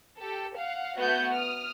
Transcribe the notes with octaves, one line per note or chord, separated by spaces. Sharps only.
G4 A4
F5 F#5
A3 B3 F#4 F#5 G6
D#6 F6